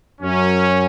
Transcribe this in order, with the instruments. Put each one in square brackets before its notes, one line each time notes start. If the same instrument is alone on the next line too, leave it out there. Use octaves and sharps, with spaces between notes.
[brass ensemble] F#2 F#3 C#4